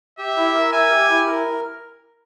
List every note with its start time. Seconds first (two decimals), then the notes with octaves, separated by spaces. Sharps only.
0.18 G4 E5
0.37 E4
0.54 A#4
0.72 E5 G#5
0.91 G4
1.09 E4
1.27 A#4